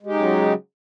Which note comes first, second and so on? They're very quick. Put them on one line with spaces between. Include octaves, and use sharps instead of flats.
G#3 G4 D#4 C#3 F#3